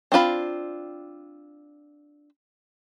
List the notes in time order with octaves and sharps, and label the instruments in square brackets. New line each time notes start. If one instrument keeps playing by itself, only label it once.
[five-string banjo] C4 D4 F4 B5